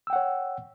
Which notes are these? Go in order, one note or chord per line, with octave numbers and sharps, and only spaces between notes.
C#5 F#5 G5 E6